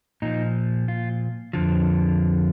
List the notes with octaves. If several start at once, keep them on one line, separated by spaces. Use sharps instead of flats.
A#2 F3 D#4
F4
F2 D3 F3